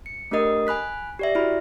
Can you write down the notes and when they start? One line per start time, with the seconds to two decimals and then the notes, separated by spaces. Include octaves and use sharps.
0.06 C#7
0.31 A3 D4 G4 A#4 D#5 D#6
0.67 G#5 B5 F#6 B6
1.19 G4 D5 E5
1.35 E4 F#4 B5